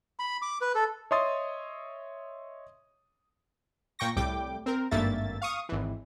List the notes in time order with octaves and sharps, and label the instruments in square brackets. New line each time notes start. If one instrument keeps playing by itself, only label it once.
[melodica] B5
D6
B4
A4
[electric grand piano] C#5 D#5 E5 C6 D#6 A6
[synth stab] A#2 G5 C#6 A#6
C2 A2 G3 G5 D6
C4 A#4
G#1 G2 A3 A#3 E5 A6
F5 C#6 D#6
G#1 E3